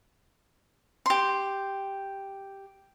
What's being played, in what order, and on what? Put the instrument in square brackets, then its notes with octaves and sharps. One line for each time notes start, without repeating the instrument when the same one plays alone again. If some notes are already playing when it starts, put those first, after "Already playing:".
[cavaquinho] G4 C6